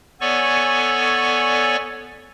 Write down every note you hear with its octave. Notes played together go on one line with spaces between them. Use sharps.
B3 A4 C#5 D5 G#5 C#6